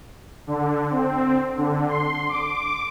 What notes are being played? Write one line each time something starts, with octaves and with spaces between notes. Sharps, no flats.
D3
C4
D3
C6
D6